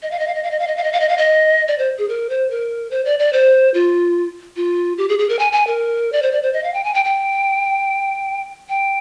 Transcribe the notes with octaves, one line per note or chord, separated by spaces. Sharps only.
D#5
F5
D#5
F5
D#5
F5
D#5
F5
D#5
F5
D#5
F5
D#5
F5
D#5
D5
C5
G#4
A#4
C5
A#4
C5
D5
D5
C5
F4
F4
G4
G#4
G#4
A#4
G#5
G#5
A#4
D5
C5
D5
C5
D#5
F5
G5
G#5
G5
G5
G5